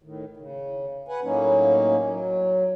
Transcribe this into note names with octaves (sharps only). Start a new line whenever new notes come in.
A2 D#3
C#3
B4 F#5 G#5
A2 F#3 A#3 C#4 D#4
F#3